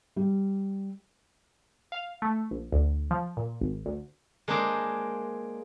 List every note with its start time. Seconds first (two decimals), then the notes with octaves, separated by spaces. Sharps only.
0.16 G3
1.92 F5
2.22 A3
2.51 A#1
2.72 D2
3.11 F3
3.37 A#2
3.61 G#1
3.86 D2
4.48 G#3 A#3 D4 C5 D#5